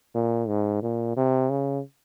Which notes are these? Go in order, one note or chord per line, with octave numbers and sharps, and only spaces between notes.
A#2
G#2
A#2
C3
C#3